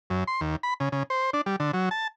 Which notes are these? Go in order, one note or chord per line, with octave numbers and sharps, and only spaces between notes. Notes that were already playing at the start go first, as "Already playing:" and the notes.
F#2
C6
D#2
B5
C#3
C#3
C5
D4
G3
D3
F#3
A5